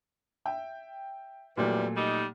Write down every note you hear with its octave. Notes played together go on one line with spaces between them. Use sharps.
E5 G5
F2 A#2 E3 F#3 G3 A3
G3 D#4